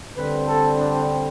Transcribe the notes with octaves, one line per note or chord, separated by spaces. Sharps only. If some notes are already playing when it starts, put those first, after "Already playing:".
D3 G3 C4 B4
A4
D4